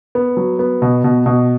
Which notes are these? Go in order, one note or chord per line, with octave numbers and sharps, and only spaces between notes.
B3
F#3
B3
B2
B2
B2